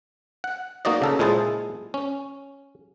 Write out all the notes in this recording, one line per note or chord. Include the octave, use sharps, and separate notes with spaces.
F#5
A#3 D#4 F#4 D5 D#5
C#3 A4 A#4
A#2 G#3 E4 G#4 C5 A5
C#4